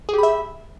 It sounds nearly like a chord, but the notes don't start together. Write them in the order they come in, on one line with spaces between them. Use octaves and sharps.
G#4 G4 B5 E5